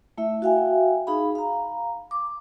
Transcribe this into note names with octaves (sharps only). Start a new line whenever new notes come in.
A3 E4 E5
F#4 E5 F5 G5 G#5
D#4 G#4 F5 B5
F5 A#5
D6